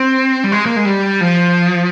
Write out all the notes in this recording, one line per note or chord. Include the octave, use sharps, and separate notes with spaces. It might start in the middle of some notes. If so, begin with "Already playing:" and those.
Already playing: C4
G3
G#3
A#3
G#3
G3
F3